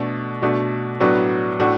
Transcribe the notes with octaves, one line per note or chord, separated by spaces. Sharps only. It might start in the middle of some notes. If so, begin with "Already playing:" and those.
Already playing: B2 A3 D4
B2 A3 D4 F#4
A2 F#3 B3 D4 F#4
A2 A3 D4 F#4